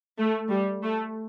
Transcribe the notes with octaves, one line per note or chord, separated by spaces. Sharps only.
A3
G3
A3